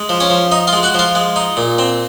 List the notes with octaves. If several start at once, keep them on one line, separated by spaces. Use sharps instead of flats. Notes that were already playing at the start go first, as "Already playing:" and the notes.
Already playing: G#3
F3
C#4 C#5
F3
D#4 D#5
F4 F5
G#3
F#4 F#5
F3 F4 F5
G#3
D#4
A#2
C4